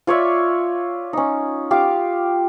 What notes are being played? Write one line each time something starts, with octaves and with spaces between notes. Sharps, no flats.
F4 C#5 D5 E5
C#4 D#4
F4 G4 F5 D6